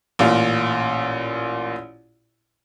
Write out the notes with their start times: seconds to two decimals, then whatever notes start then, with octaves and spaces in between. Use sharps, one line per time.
0.19 A1 A#2 F4